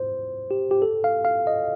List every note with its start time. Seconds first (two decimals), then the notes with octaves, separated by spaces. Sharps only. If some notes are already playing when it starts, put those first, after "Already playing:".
Already playing: C5
0.51 G4
0.71 G4
0.82 A4
1.04 F5
1.25 F5
1.47 D#5